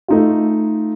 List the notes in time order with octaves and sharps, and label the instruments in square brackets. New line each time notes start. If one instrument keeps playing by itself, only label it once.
[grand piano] A3 D#4 F4